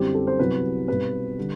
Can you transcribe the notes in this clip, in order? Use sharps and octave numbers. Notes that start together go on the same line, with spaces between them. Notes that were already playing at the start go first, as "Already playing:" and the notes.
Already playing: F#2 D3 G3 C4 E4 G4
A4
C5
C2 C3 F#3 B3 B4
B1 B2 G3 C4 B4
D3 G3